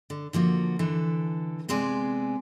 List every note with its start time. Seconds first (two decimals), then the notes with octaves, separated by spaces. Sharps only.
0.10 D3
0.33 D3 F3 A#3 F#4
0.79 D3 E3 A4
1.68 C3 G#3 B3 C4 D5 G#5